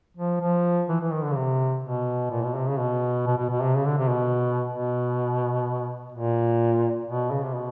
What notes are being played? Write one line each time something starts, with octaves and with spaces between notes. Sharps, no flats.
F3
F3
E3
E3
D#3
D3
C#3
C3
B2
A#2
B2
C3
C#3
B2
B2
B2
B2
C3
C#3
D3
C3
B2
B2
A#2
B2
C#3
C3
B2